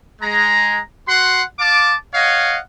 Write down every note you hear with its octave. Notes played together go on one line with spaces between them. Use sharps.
G#3 A#5
F#4 F#5 C6
F5 A5 D6
C#5 D#5 F5 F#5